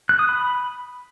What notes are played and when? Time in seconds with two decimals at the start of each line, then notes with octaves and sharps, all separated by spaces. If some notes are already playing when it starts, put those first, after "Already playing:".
0.09 F#6
0.19 D#6
0.29 B5